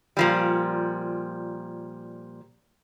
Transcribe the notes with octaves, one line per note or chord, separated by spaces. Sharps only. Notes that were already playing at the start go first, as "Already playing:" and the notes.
A#2 F3 G3